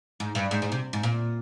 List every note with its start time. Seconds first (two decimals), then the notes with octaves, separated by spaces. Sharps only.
0.20 G#2
0.35 G2
0.51 G#2
0.62 G#2
0.72 C3
0.93 G#2
1.03 A#2